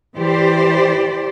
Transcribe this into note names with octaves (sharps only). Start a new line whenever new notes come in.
E3 G4 C5 D5